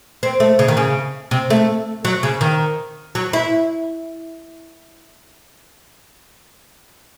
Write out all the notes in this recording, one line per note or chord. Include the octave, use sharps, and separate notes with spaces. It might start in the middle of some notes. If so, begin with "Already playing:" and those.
C4
A3
C#3
D#3
C#3
C3
A3
F#3
C#3
D#3
F#3
E4